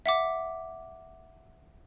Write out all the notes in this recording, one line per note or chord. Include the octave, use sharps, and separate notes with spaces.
E5 F#5 D6